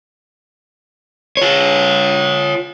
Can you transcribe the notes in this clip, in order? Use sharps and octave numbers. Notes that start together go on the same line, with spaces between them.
F4 C#5